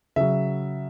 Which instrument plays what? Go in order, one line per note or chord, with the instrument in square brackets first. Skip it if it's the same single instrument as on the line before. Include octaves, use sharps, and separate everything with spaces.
[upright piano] C#3 F#3 E5